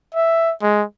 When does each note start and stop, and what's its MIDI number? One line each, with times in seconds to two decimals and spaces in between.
0.15 0.53 76
0.62 0.84 56